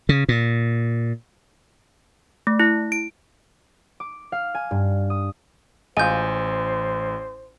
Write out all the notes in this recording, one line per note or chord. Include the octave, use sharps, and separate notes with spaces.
C#3
A#2
A3
E4
D7
D6
F5
G#5
G2
D#6
A1 G#3 F4 C5 G#5 G6